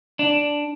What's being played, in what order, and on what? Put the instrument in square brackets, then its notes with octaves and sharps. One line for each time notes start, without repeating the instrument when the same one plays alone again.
[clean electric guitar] D4